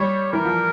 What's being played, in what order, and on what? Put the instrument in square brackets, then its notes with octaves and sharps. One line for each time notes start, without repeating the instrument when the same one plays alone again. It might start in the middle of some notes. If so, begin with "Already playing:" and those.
Already playing: [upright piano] G3 [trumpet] C#5
[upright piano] E3 [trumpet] A#4
[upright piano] F3